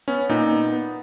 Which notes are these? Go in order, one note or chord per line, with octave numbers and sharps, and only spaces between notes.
B3 C#4
A#2 D#4
B3
B3